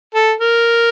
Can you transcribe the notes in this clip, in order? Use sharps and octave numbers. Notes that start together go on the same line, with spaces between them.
A4
A#4